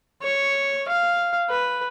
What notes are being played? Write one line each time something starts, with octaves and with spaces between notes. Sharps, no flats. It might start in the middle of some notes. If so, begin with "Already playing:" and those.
C#5
F5
B4